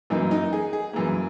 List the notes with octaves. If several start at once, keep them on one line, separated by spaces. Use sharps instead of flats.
F#2 E3 A#3 D#4
D#4
G#4
G#4
F#2 E3 A#3